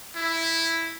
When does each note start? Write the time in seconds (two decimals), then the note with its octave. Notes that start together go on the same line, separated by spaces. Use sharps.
0.16 E4